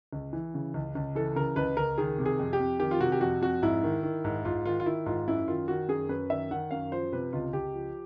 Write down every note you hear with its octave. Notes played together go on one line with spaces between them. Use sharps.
C#2
E3
C#3
C#2
C#2
E3 A4
C#3 A#4
C#2 B4
C#2 A#4
D#3 G#4
C3
G#4
F2
G4
F2
D#3 G4
F4
C3 F#4
G4
F2 F#4
F2 F#4
G#2 E4
D#3
D#3
G#2
G#2 F4
D#3 F4
F4
D#3 E4
G#2 F4
F#2 E4
D#3 F4
D#3 F#4
F#2 G#4
F#2 B4
D#3 E5
D#3 F#5
F#2 F5
F3 C5
C3 B4
C#2 F4
C#2 G4
F3